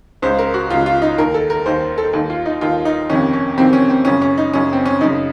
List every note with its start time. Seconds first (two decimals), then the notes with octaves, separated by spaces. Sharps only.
0.22 C#2 C#3 C5
0.39 A#4
0.54 F#4
0.70 C#2 C#3 F4
0.86 F4
1.02 D#4
1.18 D#2 D#3 A#4
1.34 A4
1.50 A#4
1.66 D#2 D#3 C5
1.98 A4
2.13 D#2 D#3
2.30 F4
2.46 D#4
2.61 D#2 D#3 F4
2.85 D#4
3.10 F2 C3 D#3 C#4
3.33 C#4
3.57 F2 C3 D#3 C4
3.73 C#4
3.90 C4
4.05 F#2 C#3 C#4
4.22 C#4
4.38 D#4
4.53 F#2 C#3 C#4
4.73 C4
4.86 C#4
5.01 F#2 C#3 D#4